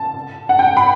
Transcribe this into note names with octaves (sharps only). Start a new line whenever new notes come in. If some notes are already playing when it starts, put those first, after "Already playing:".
Already playing: A5
F#5
G5
B5